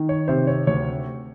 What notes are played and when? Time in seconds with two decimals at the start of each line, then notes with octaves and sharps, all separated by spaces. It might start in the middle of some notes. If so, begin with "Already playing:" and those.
Already playing: D#3
0.09 C#5
0.28 C3 C5
0.47 C#5
0.67 D2 C#5